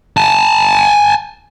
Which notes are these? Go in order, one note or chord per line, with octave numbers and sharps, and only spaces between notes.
G#5 A5